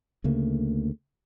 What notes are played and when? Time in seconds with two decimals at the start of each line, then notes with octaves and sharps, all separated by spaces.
0.24 D2 C#3 A3 A#3